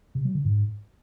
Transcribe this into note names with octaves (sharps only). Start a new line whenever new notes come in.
C3
F#3
D3
G#2